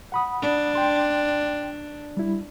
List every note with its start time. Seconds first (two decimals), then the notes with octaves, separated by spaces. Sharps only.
0.12 F#5 B5 D#6
0.42 D4
0.75 G5 C6
2.17 G3 E4